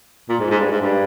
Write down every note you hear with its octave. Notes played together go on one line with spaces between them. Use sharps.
A#2
G#2
G#2
G2
G#2
G2